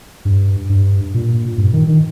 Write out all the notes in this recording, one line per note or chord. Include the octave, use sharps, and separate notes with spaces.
G2
G2
A#2
G2
D#3
D#3